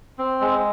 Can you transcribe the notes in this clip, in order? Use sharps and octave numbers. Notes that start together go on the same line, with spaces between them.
C4
G#3